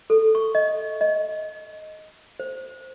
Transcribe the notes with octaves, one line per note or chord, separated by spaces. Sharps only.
A4
C#6
D#5
D#5
C5